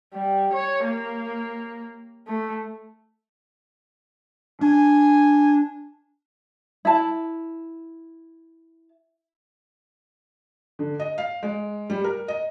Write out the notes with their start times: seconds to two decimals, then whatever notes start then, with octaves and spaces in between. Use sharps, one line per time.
0.14 G3
0.53 C#5
0.84 A#3
2.27 A3
4.61 D4 G#5
6.85 E4 A5
10.79 D3
11.00 D#5
11.18 F5
11.43 G#3
11.90 G3
12.04 A#4
12.28 D#5